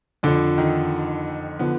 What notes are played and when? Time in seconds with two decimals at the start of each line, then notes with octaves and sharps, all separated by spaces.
0.23 F2 D3 F3 D4
0.58 D#3 D#4
1.59 D3 F3 B3